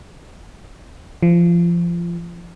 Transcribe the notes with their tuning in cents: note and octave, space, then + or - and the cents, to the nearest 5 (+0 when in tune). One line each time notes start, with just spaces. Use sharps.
F3 -25